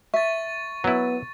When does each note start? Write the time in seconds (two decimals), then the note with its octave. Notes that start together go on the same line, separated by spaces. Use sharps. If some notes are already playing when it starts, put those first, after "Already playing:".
0.14 E5 C#6 A6
0.84 F#3 B3 E4